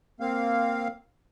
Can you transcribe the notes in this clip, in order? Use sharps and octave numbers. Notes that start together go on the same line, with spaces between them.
A#3 C4 F5